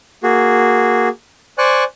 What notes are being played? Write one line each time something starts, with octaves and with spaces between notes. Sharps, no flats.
A#3 F#4 G#4
C5 D5 G#5 C#6 F#6